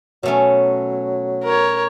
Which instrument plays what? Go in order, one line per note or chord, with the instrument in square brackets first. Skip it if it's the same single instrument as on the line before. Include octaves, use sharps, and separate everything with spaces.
[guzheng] B2 A3 C#4 [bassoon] F#3
[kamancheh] A#4 C#5